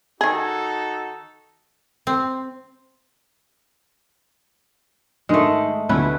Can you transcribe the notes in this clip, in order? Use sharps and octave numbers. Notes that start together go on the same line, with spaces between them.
D#3 D#4 F#4 G#4 A4
C4
G#2 D#3 G#3 A3 D#6
D2 B2 C#4 E4 B4